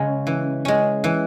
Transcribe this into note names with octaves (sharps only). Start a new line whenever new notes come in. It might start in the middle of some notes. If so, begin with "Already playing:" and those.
Already playing: C#3 G#3 C#4
E3
G#3 C#4
E3